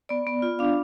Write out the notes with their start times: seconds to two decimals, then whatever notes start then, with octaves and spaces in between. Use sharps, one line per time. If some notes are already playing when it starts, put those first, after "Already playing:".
0.09 B3 D5
0.27 B3
0.42 F4
0.59 D4 F5